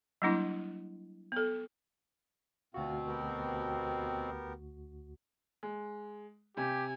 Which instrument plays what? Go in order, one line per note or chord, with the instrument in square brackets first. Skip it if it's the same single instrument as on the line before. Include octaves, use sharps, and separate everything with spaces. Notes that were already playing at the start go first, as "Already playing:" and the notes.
[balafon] F#3 G3 A#3 D4 E4 C6
B3 A4
[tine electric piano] D2 F#4 [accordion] B2 C4 [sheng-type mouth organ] F4 F5
[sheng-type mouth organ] B3 G4 A#4
[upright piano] G#3
[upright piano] C3 [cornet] G4 [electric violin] G#5